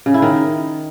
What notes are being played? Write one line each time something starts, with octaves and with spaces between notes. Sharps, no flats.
C#3
E4
D#3